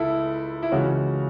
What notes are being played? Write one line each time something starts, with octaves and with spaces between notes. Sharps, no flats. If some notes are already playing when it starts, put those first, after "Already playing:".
Already playing: C#2 E4 A4
E4
C#2 C#3 E3 C#4 F#4